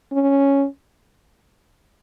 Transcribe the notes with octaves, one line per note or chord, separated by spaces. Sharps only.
C#4